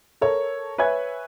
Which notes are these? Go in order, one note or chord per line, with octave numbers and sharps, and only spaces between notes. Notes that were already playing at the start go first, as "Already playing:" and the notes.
A4 A#4 C#5
B4 C#5 E5 G#5 F#6 G#6